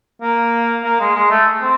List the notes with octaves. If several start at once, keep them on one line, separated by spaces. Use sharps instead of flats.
A#3
A#3
G#3
G#3
A3
C4